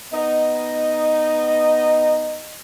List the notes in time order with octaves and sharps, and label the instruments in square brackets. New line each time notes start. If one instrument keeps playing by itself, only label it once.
[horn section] B3 D#4 D#5